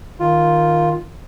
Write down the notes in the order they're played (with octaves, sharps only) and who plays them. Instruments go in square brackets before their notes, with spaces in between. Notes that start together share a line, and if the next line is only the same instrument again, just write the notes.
[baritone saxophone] D#3 [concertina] F4